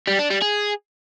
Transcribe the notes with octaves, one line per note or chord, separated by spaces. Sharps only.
G3
D4
G3
G#4